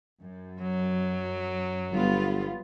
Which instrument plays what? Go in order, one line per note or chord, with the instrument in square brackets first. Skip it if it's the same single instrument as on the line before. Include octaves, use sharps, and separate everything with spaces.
[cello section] F#2
[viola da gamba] F#3
[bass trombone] G1 [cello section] G3 B3 F4